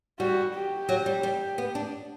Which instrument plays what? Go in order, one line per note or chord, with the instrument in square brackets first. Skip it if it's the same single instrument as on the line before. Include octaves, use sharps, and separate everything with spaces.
[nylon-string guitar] G3 [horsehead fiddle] F#4
[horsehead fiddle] G4
[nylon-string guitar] F#3
G3
G3
B3
D4